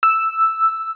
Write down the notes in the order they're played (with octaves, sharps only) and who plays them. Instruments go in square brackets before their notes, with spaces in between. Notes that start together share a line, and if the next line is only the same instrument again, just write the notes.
[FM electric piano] E6